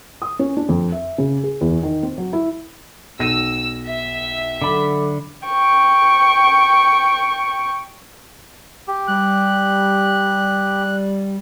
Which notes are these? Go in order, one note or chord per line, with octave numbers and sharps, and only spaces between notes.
D#6
C#4
D4
F2
E5
C#3
G#4
E2
D#3
C4
F#3
E4
B1 E6 A#6 D#7
E5
D3 F#3 A4 B5 D6
G5 C#6
G4
G3 F#6